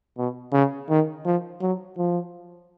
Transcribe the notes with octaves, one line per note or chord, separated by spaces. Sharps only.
B2
C#3
D#3
F3
F#3
F3